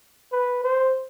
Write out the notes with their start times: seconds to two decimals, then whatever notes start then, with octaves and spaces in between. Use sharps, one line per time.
0.32 B4
0.64 C5